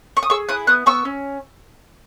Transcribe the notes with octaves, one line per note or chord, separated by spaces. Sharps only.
C#6
D#6
G#4 C#6 E6
E4 D#6 F#6
B3 D#6 F#6
B3 C#6 E6
C#4